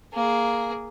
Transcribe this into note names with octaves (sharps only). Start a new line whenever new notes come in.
A#3 G#4